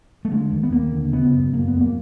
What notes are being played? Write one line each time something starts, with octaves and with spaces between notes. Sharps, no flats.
A3
D3 G#3
D#2
B3
D#2 A#3
D3
C#3 B3
F#2
F#2 A#3
B3
F#2
A#3